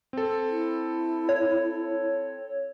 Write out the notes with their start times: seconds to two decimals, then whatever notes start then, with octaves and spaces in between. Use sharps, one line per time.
0.13 C4 A4
0.49 E4
1.29 C#5